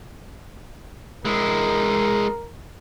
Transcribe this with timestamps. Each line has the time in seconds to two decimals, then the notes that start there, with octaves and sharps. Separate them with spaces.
1.25 G#3 E4 A#4